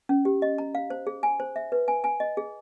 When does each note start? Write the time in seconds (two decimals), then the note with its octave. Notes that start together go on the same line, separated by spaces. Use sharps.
0.09 C#4
0.25 G4
0.42 D#5
0.58 A#5
0.75 F5
0.90 C5
1.07 G#4
1.23 G#5
1.40 C5
1.56 E5
1.72 B4
1.88 G#5
2.04 G#5
2.20 D#5
2.37 G#4